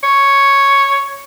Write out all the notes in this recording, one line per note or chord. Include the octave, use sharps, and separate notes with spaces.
C#5